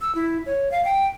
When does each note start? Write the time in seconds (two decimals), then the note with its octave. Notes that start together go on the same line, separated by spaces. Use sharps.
0.01 E6
0.15 E4
0.46 C#5
0.71 F5
0.85 G5